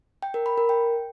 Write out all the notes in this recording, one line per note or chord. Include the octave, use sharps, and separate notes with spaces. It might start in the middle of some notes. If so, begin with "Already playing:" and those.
G5
A#4
B5
A#4
G5